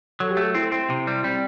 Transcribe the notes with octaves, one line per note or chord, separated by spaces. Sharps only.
F#3 A4
G4
A3
A4
C4 E4
C4
C3
G3
G3 C4